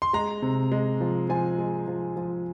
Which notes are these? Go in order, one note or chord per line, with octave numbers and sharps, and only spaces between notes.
C6
G#3 A#5
C3
G#3
F3
F3 G#5
G#3
F3
F3